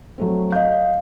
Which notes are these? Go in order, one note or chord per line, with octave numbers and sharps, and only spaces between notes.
F#3 A3 C4
D#5 F5 G6